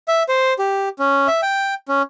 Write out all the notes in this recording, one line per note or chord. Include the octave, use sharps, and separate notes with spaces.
E5
C5
G4
C#4
E5
G5
C#4